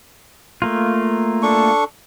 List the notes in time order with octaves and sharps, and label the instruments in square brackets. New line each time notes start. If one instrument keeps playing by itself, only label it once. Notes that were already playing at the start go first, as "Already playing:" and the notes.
[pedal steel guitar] A3 A#3 F4
[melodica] D4 A4 C#6